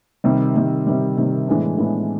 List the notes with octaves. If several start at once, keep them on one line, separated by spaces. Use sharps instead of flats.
C3 D#3 G3
C3 D#3 G3
C3 D#3 G3
C3 D#3 G3
A2 E3 G#3 B3 D4
A2 E3 G#3 B3 D4